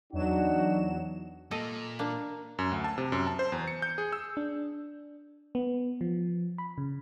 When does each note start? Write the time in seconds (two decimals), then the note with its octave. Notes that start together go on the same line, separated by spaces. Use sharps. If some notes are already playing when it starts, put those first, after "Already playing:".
0.13 E2 F#3 D4 D#4 F#4 E7
1.51 A#2 A4 D#5
1.99 A#3 D4
2.59 F#2
2.72 D2
2.84 A5
2.98 C3
3.12 F#2
3.27 A5
3.39 C5
3.52 E2
3.68 C#7
3.82 G6
3.98 G#4
4.13 E6
4.37 D4
5.55 B3
6.01 F3
6.58 B5
6.78 C#3